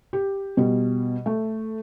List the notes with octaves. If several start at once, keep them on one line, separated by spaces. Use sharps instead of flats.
G4
B2 G3
A3